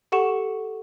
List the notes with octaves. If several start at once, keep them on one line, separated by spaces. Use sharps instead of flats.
G4 A4 F#5 C#6 E7